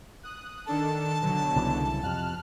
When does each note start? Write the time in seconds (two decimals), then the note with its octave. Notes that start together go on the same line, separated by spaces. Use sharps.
0.23 D#6 F#6
0.67 D#3 D4 A4 A5
1.21 B2 D3 F#3
1.56 C2 C#3 E3
2.03 F2 C3 F6 F#6